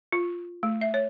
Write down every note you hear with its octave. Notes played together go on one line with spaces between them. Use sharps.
F4
A3
E5
C#5